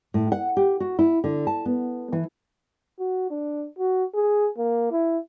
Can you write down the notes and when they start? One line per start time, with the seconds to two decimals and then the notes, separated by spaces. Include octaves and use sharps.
0.14 A2
0.32 F#5
0.57 G4
0.80 F#4
0.99 E4
1.24 D3
1.47 A5
1.66 B3
2.12 E3
3.00 F#4
3.31 D4
3.79 F#4
4.15 G#4
4.58 A#3
4.91 E4